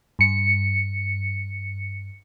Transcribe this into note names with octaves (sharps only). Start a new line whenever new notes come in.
G2 C#7